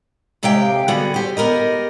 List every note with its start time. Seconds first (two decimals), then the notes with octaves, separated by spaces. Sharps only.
0.43 D#2 C3 G#3 G4 F5 G5
0.88 D3 G3 B3 F#4 G#4
1.14 G4 C5
1.37 B3 G4 A#4 D#5